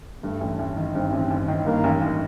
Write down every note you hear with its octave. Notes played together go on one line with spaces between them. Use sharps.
G2 A3
A1
A1
D#3
G2 C4
A1
A1
D#3
G2 A#3
A1
A1